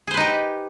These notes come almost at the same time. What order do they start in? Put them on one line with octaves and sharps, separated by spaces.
G#4 C5 B4 D#4 G4